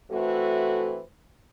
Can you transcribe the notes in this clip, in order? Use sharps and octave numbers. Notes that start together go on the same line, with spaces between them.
E3 A3 C4 F#4 A4